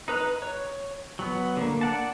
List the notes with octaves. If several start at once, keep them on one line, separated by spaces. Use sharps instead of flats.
D#4 B4 A#5 F#6
C#5
F#3 B3
D3 A#3
D5 F#5 A5